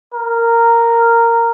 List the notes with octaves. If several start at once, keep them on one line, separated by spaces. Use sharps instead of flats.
A#4